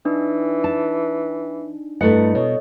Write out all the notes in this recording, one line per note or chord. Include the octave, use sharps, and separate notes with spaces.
E3 D4 D#4
A5
G2 A3 E4 B4 D#5 F#5
B2 C#5 D#5